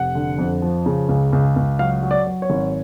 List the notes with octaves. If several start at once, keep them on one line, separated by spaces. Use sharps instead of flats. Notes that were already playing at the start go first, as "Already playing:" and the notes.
Already playing: F1 F#5
D3
F2
F3
C#3
C#2
C#2
C#2
F#3 F5
F#3
D5
F#3
C#5
G#1